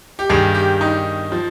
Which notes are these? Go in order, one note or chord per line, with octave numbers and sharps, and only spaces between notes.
G4
G2 D#3 G#4
G4
D#4
F3